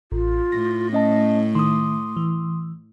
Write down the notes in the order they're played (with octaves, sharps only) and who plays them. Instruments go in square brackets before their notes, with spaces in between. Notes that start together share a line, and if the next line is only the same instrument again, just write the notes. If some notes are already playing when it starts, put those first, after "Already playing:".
[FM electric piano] A1 [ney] F4
[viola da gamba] A2 [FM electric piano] A#6
[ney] A3 [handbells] C#4 D#5 A5
[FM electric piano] D#3 [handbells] C6 D6 D#6
[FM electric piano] E3